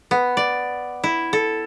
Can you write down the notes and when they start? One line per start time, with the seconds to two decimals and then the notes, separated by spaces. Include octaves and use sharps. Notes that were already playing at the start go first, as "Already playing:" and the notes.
0.11 B3
0.37 D5
1.04 E4
1.33 A4